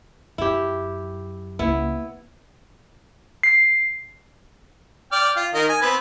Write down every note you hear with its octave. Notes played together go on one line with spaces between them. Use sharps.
F#2 E4 G4
C#2 A#3 B3 E4
C7
D5 G5 F6
F4
D#3 A#4 D#5
G#5
B3 C4 B4